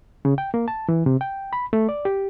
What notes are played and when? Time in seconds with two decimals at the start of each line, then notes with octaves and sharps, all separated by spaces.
0.25 C#3
0.38 G5
0.54 A#3
0.68 A5
0.89 E3
1.06 C3
1.21 G5
1.53 B5
1.73 A3
1.89 D5
2.05 G4